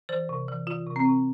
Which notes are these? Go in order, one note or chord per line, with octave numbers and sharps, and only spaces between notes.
E3 C5
C3
E3
E3 F4
C3
C4
C3